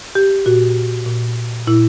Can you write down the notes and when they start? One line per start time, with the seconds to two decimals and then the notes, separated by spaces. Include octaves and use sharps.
0.15 G4
0.46 A#2 F#4
1.06 A#2
1.67 A#2 E4